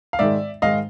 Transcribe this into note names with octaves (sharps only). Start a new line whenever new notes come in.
F5
G#2 D#3 G#3 D5 E5
G#2 D#3 G#3 D#5 F5